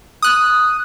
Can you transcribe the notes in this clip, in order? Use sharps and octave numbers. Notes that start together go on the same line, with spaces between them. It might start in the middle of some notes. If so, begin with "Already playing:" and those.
D#6 F#6